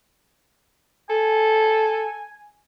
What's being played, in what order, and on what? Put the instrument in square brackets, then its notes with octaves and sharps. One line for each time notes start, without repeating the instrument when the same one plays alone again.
[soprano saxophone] A4 [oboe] G#5